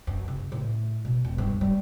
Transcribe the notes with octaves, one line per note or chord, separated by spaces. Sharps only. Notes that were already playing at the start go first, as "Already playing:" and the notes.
F#2
C#3
A2
B2
E1
G2
G3